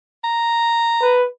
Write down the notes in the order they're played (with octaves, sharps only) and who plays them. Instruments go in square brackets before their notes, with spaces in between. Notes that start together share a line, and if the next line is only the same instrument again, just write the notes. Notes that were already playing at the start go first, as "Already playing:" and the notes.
[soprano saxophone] A#5
[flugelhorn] B4